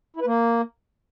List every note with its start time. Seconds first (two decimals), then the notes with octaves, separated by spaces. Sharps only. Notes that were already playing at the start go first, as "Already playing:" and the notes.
0.16 E4
0.21 B4
0.26 A#3